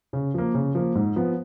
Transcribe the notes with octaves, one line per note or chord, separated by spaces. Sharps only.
C#3
F3 A#3
C#3
F3 A#3
G#2
F3 B3